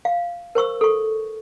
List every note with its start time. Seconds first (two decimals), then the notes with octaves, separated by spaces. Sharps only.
0.05 F5
0.55 A#4 C5 C#6 E6
0.81 A4 C#6